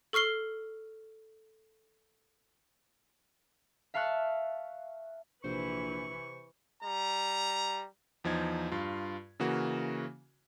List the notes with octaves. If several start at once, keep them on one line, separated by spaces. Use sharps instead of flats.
A4 C#6 F6 C7 G7
E5 F5 A5 C#6 F#6
A#1 C3 E3 B4 C5 C#6
G3 A#5
E2 F3 D#4 G#6
G2 F4
C#3 E3 A#3 F#4